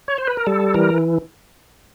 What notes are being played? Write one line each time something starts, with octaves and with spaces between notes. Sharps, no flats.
C#5
C5
B4
A#4
G3 A4
E3 A#4